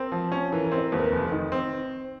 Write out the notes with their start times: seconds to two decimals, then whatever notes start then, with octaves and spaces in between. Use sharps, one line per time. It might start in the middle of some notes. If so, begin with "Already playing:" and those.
Already playing: C4 A#4
0.12 F3
0.32 C#4
0.52 E3 A#4
0.65 A#4
0.72 C4
0.78 C5
0.92 D#2 B4
0.99 A#4
1.07 F1 B4
1.32 D#3
1.52 C4